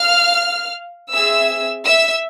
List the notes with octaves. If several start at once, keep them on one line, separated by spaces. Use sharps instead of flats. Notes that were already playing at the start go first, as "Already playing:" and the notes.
Already playing: F5 F6
C4 G#4 E5 E6
E5 E6